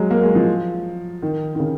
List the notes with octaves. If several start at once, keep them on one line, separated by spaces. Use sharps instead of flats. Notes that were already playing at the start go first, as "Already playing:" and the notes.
Already playing: F#3 G#3
A#3
G#3
F3
D#3
D#3
C#3